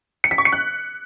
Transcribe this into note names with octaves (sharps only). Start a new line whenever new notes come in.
C#7
B6
C#6
C#7
F#6